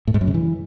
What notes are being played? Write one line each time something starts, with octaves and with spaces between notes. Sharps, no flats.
A2
G#2
F#2
C#3
E3